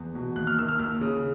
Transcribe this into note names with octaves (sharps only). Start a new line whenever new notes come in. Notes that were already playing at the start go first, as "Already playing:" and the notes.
Already playing: E2
B2
D#2 F#6
F6
D#3 E6
F6
D#2 F6
C#3